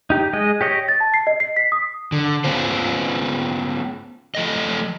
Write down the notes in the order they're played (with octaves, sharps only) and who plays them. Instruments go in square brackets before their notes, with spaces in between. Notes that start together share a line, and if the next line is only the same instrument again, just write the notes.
[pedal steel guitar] D#4 G4
G#3 D#5
G4 C#5 D#5
[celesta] A6
A5
C7
D#5
C7
B6
D#6
[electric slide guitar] D3
B3 C#4 F4 C5
F3 A3 D#5